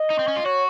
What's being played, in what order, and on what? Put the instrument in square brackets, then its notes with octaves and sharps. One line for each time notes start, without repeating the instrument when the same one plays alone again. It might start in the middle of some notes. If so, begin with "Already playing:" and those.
Already playing: [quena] D#5
[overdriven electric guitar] D#4
C4
C#4
F4
[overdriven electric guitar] F#4 [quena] C#5